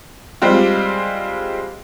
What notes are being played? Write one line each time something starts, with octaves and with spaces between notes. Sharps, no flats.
G3 G#3 C4 F4